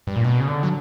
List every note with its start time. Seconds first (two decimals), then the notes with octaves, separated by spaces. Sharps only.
0.07 G2
0.16 A#2
0.24 B2
0.40 C#3
0.48 D3
0.63 F#3